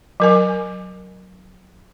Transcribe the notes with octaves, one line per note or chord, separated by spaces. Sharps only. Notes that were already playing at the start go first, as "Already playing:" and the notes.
F#3 A#4 G#5